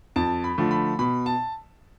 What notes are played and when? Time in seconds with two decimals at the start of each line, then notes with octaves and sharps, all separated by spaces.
0.16 F2 A5
0.44 B5
0.58 D3 F3 A3
0.71 B5
0.99 B2 B5
1.26 A5